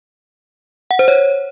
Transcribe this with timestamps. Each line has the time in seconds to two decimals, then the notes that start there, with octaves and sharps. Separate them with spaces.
0.91 F#5
0.99 C5
1.08 C#5